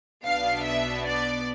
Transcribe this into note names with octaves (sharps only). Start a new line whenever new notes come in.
B1 B2 B3 D4 F5
E5
D5